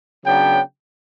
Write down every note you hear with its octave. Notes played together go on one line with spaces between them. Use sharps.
C#3 F#3 B3 D4 G5